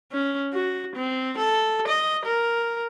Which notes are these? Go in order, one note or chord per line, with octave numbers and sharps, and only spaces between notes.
C#4
F#4
C4
A4
D#5
A#4